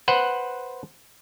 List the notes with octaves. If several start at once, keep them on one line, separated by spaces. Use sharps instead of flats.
B4 C5 F#5